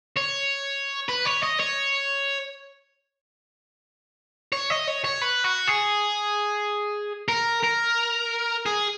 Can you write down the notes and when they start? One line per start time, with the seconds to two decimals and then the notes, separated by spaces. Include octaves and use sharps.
0.16 C#5
1.09 B4
1.26 C#5
1.43 D#5
1.60 C#5
4.53 C#5
4.70 D#5
4.87 C#5
5.04 C#5
5.21 B4
5.44 F#4
5.67 G#4
7.28 A#4
7.63 A#4
8.66 G#4